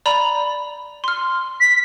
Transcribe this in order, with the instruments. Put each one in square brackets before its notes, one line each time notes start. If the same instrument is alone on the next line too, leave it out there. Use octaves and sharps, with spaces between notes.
[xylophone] D5 A#5 B5
C6 F6
[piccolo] B6